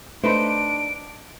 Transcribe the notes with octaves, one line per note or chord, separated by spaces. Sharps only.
A3 D4 D#4 B4 C5 B5 C#7 D7